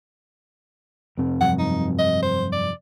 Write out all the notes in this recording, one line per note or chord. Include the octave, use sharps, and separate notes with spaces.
F2 C3 C4
G2 F3 F#3 F#5
D#4
D#5
C5
D5